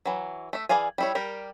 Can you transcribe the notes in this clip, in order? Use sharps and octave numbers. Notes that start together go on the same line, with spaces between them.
E3 F#3
A3 E5
E3 G#4 D5 F5 G#5
G3 E4 C#5
G3 G4 A#4